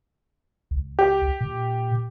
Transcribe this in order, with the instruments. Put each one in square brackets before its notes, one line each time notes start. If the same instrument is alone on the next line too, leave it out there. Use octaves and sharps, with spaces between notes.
[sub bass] C#2
[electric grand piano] G4
[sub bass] A#2